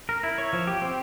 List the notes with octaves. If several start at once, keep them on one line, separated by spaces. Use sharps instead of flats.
A#4
E4
C#5
F3
G4
C4